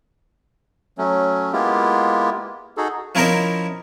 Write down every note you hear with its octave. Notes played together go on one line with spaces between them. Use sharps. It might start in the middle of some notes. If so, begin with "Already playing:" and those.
F#3 A3 C#4
G#3 A#3 B3 E4 F4 G4
D#4 F#4 G#4 A4
F3 C#4 E4 A#4 C5 D#5